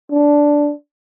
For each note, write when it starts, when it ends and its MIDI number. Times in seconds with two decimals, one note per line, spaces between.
0.12 0.72 62